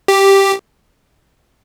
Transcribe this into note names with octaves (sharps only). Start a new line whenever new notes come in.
G4